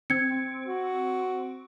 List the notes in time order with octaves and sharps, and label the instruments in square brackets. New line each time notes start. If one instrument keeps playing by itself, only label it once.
[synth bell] C4 [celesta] G#6 C#7
[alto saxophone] F#4